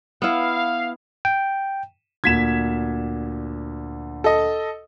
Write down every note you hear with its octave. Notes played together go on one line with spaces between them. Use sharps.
B3 E4 F5
G5
D2 A#2 G#6 B6 E7
A4 D#5